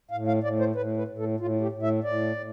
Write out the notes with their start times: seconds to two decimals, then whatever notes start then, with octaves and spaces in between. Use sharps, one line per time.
0.11 A2 F5
0.27 F5
0.43 A2 D5
0.60 C5
0.75 A2 B4
0.97 B4
1.08 A2
1.18 A4
1.40 A2 F4
1.61 G4
1.72 A2
1.83 E5
2.04 A2 D5
2.36 A2